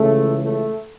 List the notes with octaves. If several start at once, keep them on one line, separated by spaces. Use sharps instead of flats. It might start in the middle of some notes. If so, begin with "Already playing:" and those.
Already playing: C#2 C#3 E3 A3
A3